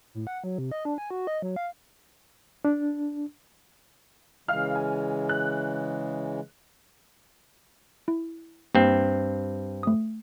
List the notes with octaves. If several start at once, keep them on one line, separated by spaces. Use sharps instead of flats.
A2
F#5
F#3
C3
D#5
D4
G#5
F#4
D#5
F#3
F5
D4
C#3 E3 G#3 F5 F6
G#5
F#6
E4
G2 A#3 C4
A3 D#6